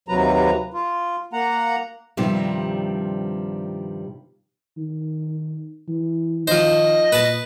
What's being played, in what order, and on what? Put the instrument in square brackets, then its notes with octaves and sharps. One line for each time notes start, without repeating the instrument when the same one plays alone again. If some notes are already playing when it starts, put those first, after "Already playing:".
[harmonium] D#2 C3 F#3 B4 A#5
F4
A#3 F#5 A#5
[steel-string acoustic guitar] G2 C3 D#3 F3 G3
[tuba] D#3
E3
[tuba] D#3 [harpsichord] F3 C5 [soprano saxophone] D#5
[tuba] A#2 [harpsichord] B4 A5